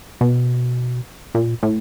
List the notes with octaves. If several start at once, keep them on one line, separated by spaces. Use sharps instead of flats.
B2
A#2
A2